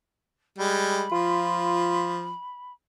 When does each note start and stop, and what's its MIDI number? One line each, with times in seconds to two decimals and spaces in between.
0.58 1.07 55
0.58 1.07 56
0.58 2.72 83
1.12 2.32 53
1.12 2.17 65